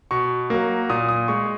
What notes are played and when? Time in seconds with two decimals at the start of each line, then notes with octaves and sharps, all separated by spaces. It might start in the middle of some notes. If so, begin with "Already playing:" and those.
0.11 B2 C#6
0.50 F#3 A#3
0.90 A#2 D#6
1.09 D#6
1.28 G#3 C#6